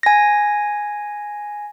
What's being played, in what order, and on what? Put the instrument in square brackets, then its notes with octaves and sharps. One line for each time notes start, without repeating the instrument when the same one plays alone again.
[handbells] G#5 A#6